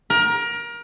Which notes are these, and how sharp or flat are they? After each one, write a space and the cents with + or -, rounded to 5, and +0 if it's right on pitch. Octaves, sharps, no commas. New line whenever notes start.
A#4 +25